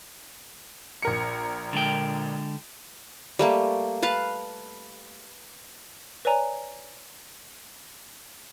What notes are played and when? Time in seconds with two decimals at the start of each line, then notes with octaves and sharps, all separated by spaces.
1.02 A#1 A#4 C#7
1.73 D3 G#3 G5
3.39 G3 A3 A#3
4.02 B4 F5 A5
6.25 B4 C#5 D5 G#5 A#5